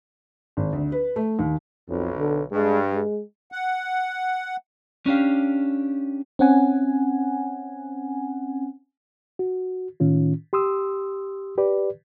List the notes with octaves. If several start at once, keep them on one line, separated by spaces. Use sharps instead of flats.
G#1
D2
B4
A3
D#2
B1 F2
D3
G2 G#3
G#3
F#5
C#4 D4 G4 F5
C4 C#4 F#5 G#5
F#4
A2 D#3 C#4 F4
G4 C6 D#6 E6
G4 B4 D5